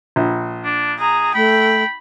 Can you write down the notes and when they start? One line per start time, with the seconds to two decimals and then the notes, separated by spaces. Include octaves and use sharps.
0.16 A#1
0.64 D4
0.99 G#4 A#5
1.35 A3 G5 B5